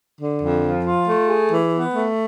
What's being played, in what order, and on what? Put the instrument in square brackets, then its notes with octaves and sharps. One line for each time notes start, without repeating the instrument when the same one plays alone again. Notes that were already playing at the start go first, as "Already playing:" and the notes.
[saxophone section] D3
F2
F3
F4
A3
G#4
E3
B3
A3